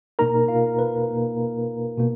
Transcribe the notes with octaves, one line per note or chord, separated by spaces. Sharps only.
B2 A#3 D#4 A#4 A#5
F4 F5
B4
B2 A#3 D#4
B2 A#3